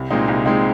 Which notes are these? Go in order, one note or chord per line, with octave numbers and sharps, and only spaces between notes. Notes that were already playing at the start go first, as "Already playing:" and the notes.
Already playing: C2
A#2 G#3 C4 D#4
C2
A#2 G#3 C4 D#4